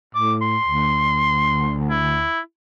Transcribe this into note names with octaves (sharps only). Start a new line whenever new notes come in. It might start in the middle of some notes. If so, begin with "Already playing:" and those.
A2 D6
C6
D2
E4